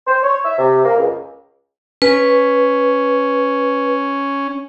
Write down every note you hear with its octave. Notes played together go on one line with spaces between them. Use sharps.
C5
C#5
E5
C3
A#3
C#2
C#4 B4